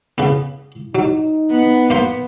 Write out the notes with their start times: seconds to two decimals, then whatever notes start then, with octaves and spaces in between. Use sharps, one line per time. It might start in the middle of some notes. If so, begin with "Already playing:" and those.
0.18 C#3 B3
0.95 F#3 D#4
1.50 B3
1.90 A#3 C5 C6